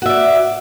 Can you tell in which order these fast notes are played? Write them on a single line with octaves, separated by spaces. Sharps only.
F#4 E5 D5